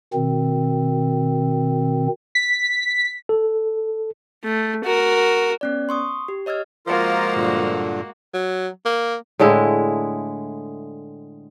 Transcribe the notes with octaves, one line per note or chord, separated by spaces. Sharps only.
B2 D#3 C4
B6
A4
A3
F#4 A#4
B3 C#4 D5
C6 C#6 D#6
G4
C#5 D#5 E6 F6 G#6
F3 G#3 A#3 F4 F#4 A#4
G2 A#2 D3
F#3
A#3
A2 D3 G#3 E4